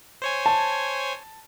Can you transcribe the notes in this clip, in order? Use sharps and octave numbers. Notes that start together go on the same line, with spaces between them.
C5 C#5 G#5
A5